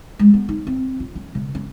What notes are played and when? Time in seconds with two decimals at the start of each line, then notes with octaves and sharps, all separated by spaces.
0.19 G#3
0.34 B3
0.49 D#4
0.67 C4
1.00 F4
1.15 C#4
1.35 C#3
1.55 C#4